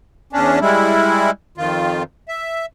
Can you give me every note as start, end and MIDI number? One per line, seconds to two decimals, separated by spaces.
0.33 0.59 40
0.33 0.59 61
0.33 0.59 62
0.61 1.31 55
0.61 1.31 56
0.61 1.31 64
1.58 2.03 41
1.58 2.03 51
1.58 2.03 65
2.29 2.66 76